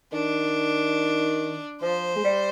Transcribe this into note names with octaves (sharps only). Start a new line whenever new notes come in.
D#3 D4
F3 C5
G#3
G3